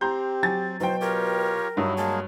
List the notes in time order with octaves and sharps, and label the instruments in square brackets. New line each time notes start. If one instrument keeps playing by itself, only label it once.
[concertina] C4 [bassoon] G4 [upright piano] A#5 C6 G6
[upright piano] F#3 G#5 A6
[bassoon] B2 [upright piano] F#3 G5 [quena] C5
[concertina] F4 G4 C#5 [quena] A#4
[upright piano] G2 [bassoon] F#3 [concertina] D#4 E4
[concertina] G#3 A#3 G#4 [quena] A5